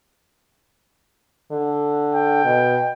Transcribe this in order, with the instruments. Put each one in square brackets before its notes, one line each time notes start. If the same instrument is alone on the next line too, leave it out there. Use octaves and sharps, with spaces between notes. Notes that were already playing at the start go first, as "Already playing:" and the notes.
[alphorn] D3
[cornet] G5
[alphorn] B2